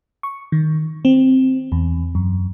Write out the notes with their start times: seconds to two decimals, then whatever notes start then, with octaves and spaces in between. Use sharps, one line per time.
0.23 C#6
0.52 D#3
1.05 C4
1.72 E2
2.15 F#2